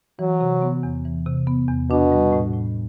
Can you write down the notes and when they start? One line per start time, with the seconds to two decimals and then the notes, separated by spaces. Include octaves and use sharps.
0.19 E3 F#3
0.41 C3
0.62 B3
0.83 E2
1.05 E3
1.26 C3
1.47 B3
1.68 E2
1.90 B2 D4
2.12 G3
2.32 A2
2.54 A2